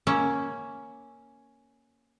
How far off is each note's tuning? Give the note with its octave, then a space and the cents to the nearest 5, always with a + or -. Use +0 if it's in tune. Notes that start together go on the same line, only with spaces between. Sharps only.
A#3 +0 C#4 +0 E5 +0